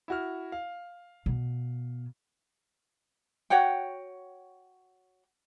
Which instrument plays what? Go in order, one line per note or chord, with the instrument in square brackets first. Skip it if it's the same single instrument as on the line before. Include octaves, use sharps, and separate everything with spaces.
[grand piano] E4 F#4 F6
F5
[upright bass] B2
[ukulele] F#4 C#5 F#5 G5